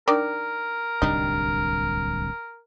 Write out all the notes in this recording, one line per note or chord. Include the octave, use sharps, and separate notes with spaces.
D#3 D4 A#4 D5
D1 C2 G3 D4 D#4